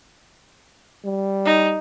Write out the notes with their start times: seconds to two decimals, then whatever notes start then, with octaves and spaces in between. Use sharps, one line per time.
1.05 G3
1.45 D#4